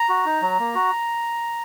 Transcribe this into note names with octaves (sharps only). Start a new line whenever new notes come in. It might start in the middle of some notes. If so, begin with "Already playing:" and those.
Already playing: A#5
F#4
D#4
F#3
A#3
F#4